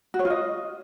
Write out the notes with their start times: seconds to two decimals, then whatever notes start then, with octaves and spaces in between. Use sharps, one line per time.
0.14 F#4
0.19 C#5
0.25 F4
0.30 D#5